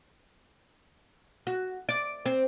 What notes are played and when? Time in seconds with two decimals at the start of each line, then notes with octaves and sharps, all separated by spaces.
1.47 F#4
1.89 D5
2.26 C4